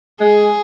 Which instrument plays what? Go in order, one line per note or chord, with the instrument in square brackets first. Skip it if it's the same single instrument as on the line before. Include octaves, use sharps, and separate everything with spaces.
[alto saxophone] G#3 [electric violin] G#4